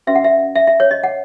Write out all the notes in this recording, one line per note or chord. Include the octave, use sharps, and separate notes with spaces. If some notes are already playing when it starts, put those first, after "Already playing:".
C#4 F#4 B4 E5
F#5
E5
E5
E5
C#5
D#5
F#5